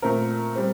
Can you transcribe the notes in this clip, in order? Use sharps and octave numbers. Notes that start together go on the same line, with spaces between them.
A#2 A3 C4 A#4
G3 C4